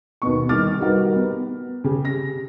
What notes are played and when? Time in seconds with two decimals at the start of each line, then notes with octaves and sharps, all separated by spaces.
0.22 D#2 B2 B3 C#6
0.49 C2 D#3 D6 F6 A6
0.80 G3 D#4 F#4 A#4 B4
1.16 B3
1.84 C#3 G4
2.05 A#6